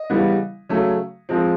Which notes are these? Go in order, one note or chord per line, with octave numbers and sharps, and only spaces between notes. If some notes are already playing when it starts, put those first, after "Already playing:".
Already playing: D#5
C#3 E3 G3 B3
C#3 F#3 A3 C#4
F3 G#3 C4